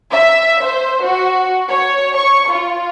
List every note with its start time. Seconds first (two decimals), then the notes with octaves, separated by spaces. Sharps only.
0.12 E5
0.63 C5
1.03 F#4
1.69 C#5
2.16 C#6
2.49 F4